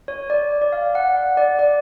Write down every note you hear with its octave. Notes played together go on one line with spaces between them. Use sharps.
C#5
D5
D5
F5
F#5
F#5
D5
D5